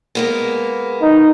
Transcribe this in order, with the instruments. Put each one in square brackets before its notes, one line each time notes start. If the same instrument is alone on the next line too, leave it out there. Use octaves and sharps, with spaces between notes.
[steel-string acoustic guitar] G#3 A#3 B3
[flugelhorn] D#4